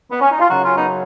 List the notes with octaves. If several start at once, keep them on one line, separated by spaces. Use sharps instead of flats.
B3
C#4
D#4
F4
F#2 C#3 F#3 D#4 F#4
C#4 F4
B3 D#4